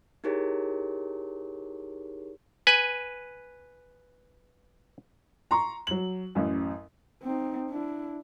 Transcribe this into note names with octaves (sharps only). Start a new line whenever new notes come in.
D#4 E4 G4 G#4 A#4 C#5
B4 G#5
A#5 C6 C#6
F#3 F#7
A1 F#2
C4 D#4
D4 E4